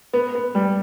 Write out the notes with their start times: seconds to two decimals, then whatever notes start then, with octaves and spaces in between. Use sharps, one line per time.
0.14 B3
0.35 B3
0.55 G3